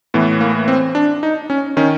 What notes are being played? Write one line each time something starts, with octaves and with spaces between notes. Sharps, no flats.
A2 E3 B3
A#3
C4
D4
D#4
C#4
D#3 C#4